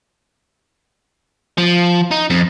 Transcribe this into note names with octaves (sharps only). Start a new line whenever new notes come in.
F3
D#4
F2